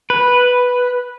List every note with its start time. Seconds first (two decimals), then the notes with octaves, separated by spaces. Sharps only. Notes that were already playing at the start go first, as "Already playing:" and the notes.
0.10 B4